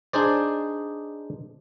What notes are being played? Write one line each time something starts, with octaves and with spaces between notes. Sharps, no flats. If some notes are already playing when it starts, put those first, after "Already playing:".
D4 D#4 G#4 C5 D5